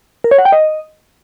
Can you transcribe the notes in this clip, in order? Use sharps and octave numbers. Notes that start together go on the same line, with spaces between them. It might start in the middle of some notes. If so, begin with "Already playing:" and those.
A#4
C#5
F#5
G5
D#5